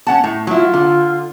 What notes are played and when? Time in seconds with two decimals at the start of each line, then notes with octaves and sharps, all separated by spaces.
0.07 C#4 F#5 A5
0.24 A2
0.47 F#3 E4 F4
0.74 D3